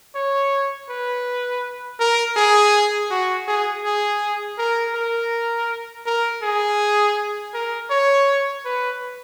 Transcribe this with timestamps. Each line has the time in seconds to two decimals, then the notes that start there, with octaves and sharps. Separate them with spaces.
0.15 C#5
0.89 B4
2.00 A#4
2.37 G#4
3.11 F#4
3.48 G#4
3.84 G#4
4.58 A#4
4.95 A#4
6.06 A#4
6.43 G#4
7.54 A#4
7.90 C#5
8.65 B4